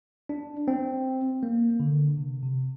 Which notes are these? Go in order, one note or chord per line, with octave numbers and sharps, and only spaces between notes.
D4
C4
A#3
D3
C3
C3